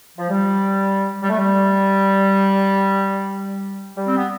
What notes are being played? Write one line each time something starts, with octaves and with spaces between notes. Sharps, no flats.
F3
G3
G3
A3
G3
G3
C4
B3